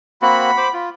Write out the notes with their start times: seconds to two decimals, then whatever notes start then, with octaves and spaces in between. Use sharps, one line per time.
0.22 A#3 C4 F#4 F#5 B5
0.57 C5 D6
0.73 F4